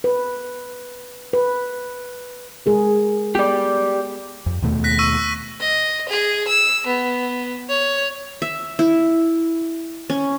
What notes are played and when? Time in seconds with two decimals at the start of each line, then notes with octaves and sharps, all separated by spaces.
0.04 B4
1.33 B4
2.66 G#3 G#4 A#4
3.35 B3 G4 D5
4.46 F2
4.62 D#2 B2 A3
4.84 F#6 A#6 B6
4.99 C#6 E6 D#7
5.60 D#5
6.09 G#4
6.48 E6
6.87 B3
7.69 C#5
8.42 E5
8.79 E4
10.10 C#4